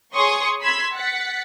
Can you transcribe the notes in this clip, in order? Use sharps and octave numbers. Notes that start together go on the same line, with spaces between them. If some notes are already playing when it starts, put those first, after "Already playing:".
G#4 C#5 C6 C#6 D#6
B5 C6 E6 G#6 B6
F#5 A6 B6 C#7